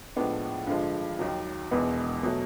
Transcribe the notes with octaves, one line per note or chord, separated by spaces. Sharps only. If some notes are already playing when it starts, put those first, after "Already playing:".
A2 F3 G#3 B3 D4
G2 D3 F3 G#3
D#2 D#3 F#3
E1 E2 B2 G#3 B3
B2 F#3 A3